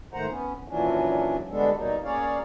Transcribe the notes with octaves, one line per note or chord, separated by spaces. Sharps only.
G#2 D#3 A3 C5 F#5 A#5
B3 C#4
D#2 A#2 E3 F#3 C#4 D4
D3 G3 G#3 B3 D4 A4
B2 F#3 G3 A#3 D#4
A#3 C#4 G#4 C#5 D5 F5